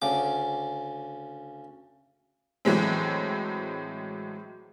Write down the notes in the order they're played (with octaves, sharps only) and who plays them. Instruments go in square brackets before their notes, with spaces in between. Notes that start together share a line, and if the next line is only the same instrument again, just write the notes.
[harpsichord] D2 C#3 D6
[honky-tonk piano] A2 E3 F#3 G#3 C4